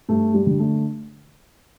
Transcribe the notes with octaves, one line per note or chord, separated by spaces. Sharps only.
G2 A3
G3
D3
A3